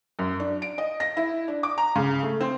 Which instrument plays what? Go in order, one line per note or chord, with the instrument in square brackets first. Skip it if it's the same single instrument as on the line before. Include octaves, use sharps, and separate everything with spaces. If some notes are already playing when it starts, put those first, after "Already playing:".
[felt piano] F#2
D4
D7
D#5
A#6
E4
D4
D6
A#5
C#3
A3
C4